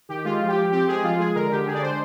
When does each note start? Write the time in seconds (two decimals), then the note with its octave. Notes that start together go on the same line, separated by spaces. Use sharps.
0.09 D#3 G4
0.24 G#3 F4
0.40 F3
0.48 G4
0.56 F3
0.71 C4 G4
0.87 G#3 G#4
1.03 F3 F4
1.19 G#3 G#4
1.35 D3 A#4
1.50 D3 G4
1.66 D4 G#4
1.74 D5
1.82 G#3 C5